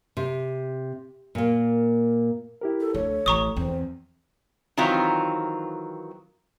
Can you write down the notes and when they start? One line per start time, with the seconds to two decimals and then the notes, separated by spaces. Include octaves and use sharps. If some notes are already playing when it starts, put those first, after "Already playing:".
0.17 C3
1.35 A#2 A#3
2.61 E4 G4 A#4
2.80 A4
2.95 D2 A4 C#5
3.26 A1 A#5 C#6 D#6
3.56 E2 C4
4.77 D#3 E3 F#3 C4 F4